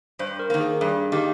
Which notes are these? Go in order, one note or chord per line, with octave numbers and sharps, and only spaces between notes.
G2 C5
A#4
D#3 A#3
G#4
G2 G#4
D#3 A#3 G4